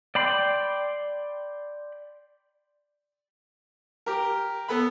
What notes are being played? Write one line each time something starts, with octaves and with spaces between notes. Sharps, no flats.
D5 G5 B5 C6
G4 A#4
B3 A4 B4 B5